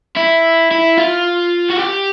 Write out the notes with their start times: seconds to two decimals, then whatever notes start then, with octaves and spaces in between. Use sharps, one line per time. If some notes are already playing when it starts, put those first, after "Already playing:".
0.17 E4
0.71 E4
0.98 F4
1.71 F#4
1.79 G4